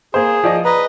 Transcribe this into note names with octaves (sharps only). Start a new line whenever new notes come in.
A#3 G#4 C5
F3 D5 D#5
B4 D#5 A#5